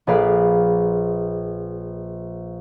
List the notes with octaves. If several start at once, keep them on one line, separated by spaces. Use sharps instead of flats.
A#1 G#4 B4 D5 F5 B5